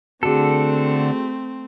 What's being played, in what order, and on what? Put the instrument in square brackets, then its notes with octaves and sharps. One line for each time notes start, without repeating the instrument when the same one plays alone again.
[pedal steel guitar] D3 A4 [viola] A3 C4 [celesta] F#4 G#4